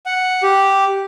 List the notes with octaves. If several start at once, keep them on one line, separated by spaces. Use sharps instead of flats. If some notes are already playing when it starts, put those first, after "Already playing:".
F#5
G4